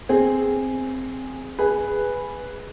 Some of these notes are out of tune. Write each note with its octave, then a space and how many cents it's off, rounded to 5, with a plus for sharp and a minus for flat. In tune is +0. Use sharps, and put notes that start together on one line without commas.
C4 +0 G#4 +0
G#4 +0 B4 +0